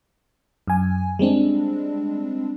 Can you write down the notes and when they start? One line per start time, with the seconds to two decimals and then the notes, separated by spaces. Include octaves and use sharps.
0.67 F#2 G#5
1.19 G3 G#3 C4 D4